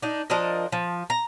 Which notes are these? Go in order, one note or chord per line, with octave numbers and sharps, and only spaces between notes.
D4 D#4
F3 D4 A#4 D#5
F3
A#5